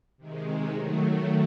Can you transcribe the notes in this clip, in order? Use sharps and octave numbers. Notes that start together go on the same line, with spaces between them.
C3 D#3 G#3
D#3 F#3 A3